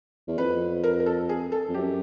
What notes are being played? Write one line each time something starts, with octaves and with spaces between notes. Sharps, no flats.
E2
F2 B4
A#4
A#4
A4
G#4
A4
F2
F#2 G4